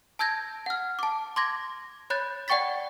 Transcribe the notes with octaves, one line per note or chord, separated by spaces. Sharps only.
A5 E6 G6 G#6 A#6
F#5 F6
A5 D6
C6 D6 G#6 A#6
C#5 B5 F#6 G6 A6
D5 F#5 G5 C#6 A6 B6